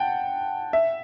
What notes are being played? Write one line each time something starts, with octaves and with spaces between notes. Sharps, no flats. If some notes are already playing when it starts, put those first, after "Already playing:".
Already playing: F#5 G5 A5
E5